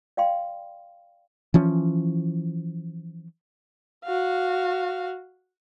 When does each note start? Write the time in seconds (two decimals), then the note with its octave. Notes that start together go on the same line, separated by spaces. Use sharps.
0.17 D5 F5 G5 C6
1.54 E3 F3 C#4
4.04 F#4 F5